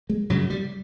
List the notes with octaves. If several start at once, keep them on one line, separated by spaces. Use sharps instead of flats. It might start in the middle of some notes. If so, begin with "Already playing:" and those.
G#3
F#2 C#3 F#3
G3